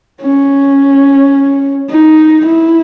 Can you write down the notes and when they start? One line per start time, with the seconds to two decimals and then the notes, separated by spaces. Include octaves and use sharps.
0.22 C#4
1.90 D#4
2.46 E4